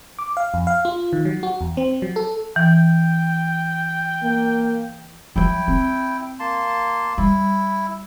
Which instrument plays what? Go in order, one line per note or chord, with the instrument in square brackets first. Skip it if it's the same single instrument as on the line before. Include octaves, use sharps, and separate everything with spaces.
[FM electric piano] D6
F5
F2
F5
F4
D#3
F#3
F#4
E2
C4
F#3
A4
[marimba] E3 [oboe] G5
[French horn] A#3
[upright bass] F3 F#3 [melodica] E4 G5
[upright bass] C4
[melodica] A#3 A5 C6
[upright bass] G3 [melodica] E4